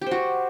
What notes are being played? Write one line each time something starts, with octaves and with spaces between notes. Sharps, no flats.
F#4 G4 C5